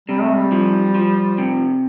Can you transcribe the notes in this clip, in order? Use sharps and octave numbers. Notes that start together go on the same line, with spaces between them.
C3 G3
A3
G3
F3
F3
C3